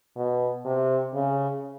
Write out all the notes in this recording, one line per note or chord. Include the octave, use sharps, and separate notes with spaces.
B2
C3
C#3